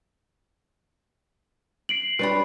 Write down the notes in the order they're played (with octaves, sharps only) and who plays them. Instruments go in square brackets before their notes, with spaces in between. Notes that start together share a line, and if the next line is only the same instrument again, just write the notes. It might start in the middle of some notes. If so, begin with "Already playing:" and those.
[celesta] C7 D7 F#7
[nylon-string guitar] G3 D4 [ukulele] B4 C#5 B5